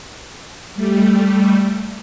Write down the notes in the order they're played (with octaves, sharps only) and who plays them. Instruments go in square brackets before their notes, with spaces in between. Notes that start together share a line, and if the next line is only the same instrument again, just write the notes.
[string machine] G3 A3